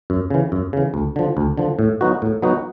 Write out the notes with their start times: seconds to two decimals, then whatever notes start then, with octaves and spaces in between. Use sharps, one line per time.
0.10 F#2
0.30 C#3 E3
0.52 F#2
0.73 C#3 E3
0.94 D2
1.16 D3 F3
1.37 D2
1.57 D3 F3
1.79 A2
2.01 F#3 B3 D#4 F#4
2.22 A2
2.42 F#3 B3 D#4 F#4